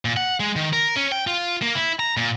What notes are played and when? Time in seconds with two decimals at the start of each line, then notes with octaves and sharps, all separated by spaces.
0.05 A#2
0.17 F#5
0.40 G#3
0.56 D#3
0.73 A#4
0.96 C#4
1.12 G5
1.27 F4
1.62 A#3
1.75 E4
1.99 A#5
2.17 A#2